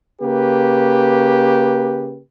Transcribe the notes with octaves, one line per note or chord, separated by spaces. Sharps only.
C#3 A#3 G4 B4